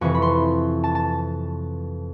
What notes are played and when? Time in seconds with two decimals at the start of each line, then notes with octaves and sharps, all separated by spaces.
0.01 F2 C3 E3 C#6
0.15 B5
0.22 C6
0.84 A5
0.95 A5